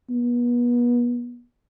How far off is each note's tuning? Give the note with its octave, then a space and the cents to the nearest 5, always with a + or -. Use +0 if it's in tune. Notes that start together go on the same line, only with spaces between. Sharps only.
B3 -35